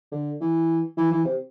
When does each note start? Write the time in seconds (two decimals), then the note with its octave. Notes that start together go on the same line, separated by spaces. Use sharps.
0.12 D3
0.41 E3
0.97 E3
1.11 E3
1.24 C3